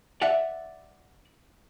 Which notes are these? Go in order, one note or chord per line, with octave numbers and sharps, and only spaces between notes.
D5 E5 F#5